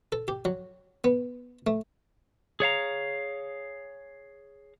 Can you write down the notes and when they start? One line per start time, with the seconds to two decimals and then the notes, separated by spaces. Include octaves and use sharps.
0.12 A4
0.28 G4
0.45 F#3
1.04 B3
1.67 A3
2.60 G#4 C#5 F5 A#5